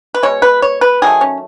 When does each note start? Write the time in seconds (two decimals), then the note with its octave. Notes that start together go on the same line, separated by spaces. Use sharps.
0.14 B4
0.23 B2 G#3 C#5
0.42 B4
0.62 C#5
0.81 B4
1.02 D#3 F#3 A3 G#4
1.21 C#4